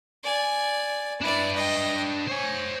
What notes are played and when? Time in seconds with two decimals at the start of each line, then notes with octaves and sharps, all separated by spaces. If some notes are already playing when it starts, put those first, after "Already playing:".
0.24 D5 G#5
1.21 D4 E4 B4 D5
1.55 D#5 G5
2.28 C5 C#5 G#5